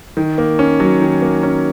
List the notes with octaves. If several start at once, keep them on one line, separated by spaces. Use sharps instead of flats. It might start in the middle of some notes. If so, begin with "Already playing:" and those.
D#3
A#3
C#4
F#3
D#3
A#3
C#4